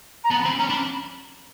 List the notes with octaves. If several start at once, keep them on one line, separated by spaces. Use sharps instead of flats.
A#5
B3 A5
B5
C4
C#4 A#5
D4 B5